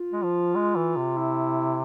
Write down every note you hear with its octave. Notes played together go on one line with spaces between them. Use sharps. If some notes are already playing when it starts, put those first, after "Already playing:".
Already playing: F4
G#3
F3
G#3
E3
C3
E4